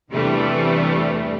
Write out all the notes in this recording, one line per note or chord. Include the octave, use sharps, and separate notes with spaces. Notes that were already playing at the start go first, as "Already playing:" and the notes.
E2 G2 C3 E3 G3 A3